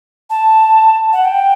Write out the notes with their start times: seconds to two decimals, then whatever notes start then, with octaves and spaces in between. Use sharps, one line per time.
0.30 A5
1.13 F#5
1.25 G5